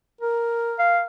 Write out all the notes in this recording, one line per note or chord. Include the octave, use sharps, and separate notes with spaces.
A#4
F5